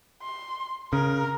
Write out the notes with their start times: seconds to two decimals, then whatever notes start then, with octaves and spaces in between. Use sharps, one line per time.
0.22 C6
0.93 C#3 A#4